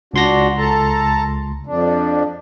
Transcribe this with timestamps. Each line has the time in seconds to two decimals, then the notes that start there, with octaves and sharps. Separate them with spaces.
0.14 C#2 D4 F#4 C6 A#6
0.58 A4 A5 A#5
1.66 F2 D4